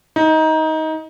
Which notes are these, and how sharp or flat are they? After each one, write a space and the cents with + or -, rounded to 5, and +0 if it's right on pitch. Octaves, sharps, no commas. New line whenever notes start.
D#4 +20